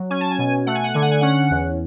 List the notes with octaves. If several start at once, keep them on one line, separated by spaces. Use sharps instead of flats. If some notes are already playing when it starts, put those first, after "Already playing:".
Already playing: F#3
C#4 G#5
A5
G#5
B2
A3 F#5
G#5
F#5
D3 G#5
F#5
G#5
C#4 F#5
E2